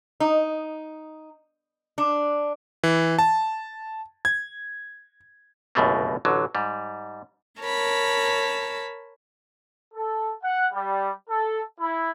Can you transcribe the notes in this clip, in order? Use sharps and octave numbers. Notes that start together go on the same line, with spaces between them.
D#4
D4
E3
A5
G#6
G1 C#2 F#2 B2 A3 A#3
A1 D3 F#3
G#2 G3
A#4 C#5 A5 B5
A4
F#5
G3
A4
E4